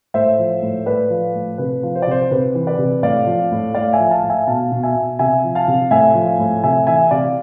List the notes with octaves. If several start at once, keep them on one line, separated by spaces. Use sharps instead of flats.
A2 C5 E5
F3
A2
A2 B4 D5
F3
A2
C3 B4
F3
C5
D5
C3 C5
C3 B4
E3
B4 D5
C3
A2 D5 F5
F3
A2
A2 D5 F5
E5 G#5
F3
F5 A5
A2
E5 G#5
B2 F5 A5
B2
E5 G#5
B2
C3 E5 G#5
F3
F5 A5
C3
A2 E5 G#5
F3
A2
C3 E5 G#5
E3 E5 G#5
C3 D5 F5